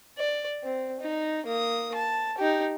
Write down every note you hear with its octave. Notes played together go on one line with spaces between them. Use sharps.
D5
C4
D#4
A#3 D#6
A5
D#4 G4